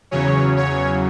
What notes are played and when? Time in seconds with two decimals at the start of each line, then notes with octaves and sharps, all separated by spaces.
0.11 E2 C#3 F#3 C#4 C#5
0.57 C#5